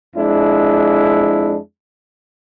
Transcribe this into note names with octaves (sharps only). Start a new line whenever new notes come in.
F2 G#3 D4 E4